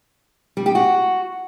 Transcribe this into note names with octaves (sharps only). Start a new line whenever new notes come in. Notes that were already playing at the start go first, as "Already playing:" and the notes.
G3
G4
F#4